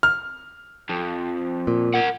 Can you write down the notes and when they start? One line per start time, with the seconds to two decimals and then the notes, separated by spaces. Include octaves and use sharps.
0.03 F6
0.90 F2
1.67 A#2
1.94 A#4 F#5